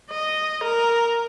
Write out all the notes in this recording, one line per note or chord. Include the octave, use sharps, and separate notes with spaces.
D#5
A#4